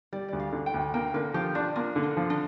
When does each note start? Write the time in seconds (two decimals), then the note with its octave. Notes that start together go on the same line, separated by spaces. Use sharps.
0.13 G3 D5
0.28 D2 D5
0.40 F5
0.53 D3
0.66 G5
0.74 D2
0.94 A#3 G5
1.14 D3 A#4
1.34 F3 G4
1.55 D4 F4
1.76 A#3 F4
1.96 D3
2.03 D4
2.17 F3
2.30 D4